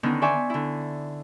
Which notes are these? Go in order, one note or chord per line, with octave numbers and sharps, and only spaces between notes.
D3 D#3 B3 C#4 D#4
C5 D5 E5 G#5 C#6
D3 E4